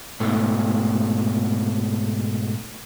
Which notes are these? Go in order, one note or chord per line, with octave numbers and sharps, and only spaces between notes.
G#2 B2 A3